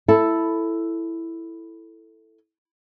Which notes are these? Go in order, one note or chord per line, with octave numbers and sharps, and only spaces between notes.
E4 A4